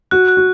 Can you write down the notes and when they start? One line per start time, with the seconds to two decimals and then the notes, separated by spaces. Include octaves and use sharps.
0.11 F#4 F#6
0.28 F#6
0.37 F#4